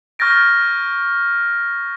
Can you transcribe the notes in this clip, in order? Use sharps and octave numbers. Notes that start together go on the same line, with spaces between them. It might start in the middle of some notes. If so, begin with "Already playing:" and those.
C#6 F6 G6 A6 A#6 D7